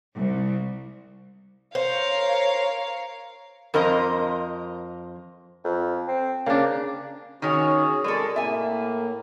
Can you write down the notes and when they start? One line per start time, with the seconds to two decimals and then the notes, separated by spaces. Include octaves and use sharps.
0.16 C2
1.75 A#4 C5 C#5 F5
3.74 F2 A#4 C5 D#5
5.64 F2
6.08 C4
6.46 C#3 A#3 D4
7.42 D#3 C#4 F#4 G#4 C#5
8.04 G#3 A4 A#4 D5
8.36 A2 A#3 E5 G#5